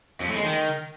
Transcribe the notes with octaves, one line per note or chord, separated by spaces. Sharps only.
F2
A2
G#3
D#3